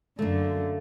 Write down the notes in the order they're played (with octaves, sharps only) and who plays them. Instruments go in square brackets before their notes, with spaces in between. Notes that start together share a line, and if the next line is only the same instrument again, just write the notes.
[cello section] F#2 D3 [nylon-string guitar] A3 A#3